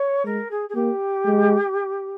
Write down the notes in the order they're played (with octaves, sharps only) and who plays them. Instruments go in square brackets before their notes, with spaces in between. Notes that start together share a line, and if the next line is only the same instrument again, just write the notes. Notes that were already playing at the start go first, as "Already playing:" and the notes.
Already playing: [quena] C#5
[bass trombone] G#3 [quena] A#4
[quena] G#4
G#4
[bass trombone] A#3 [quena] G4
[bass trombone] G#3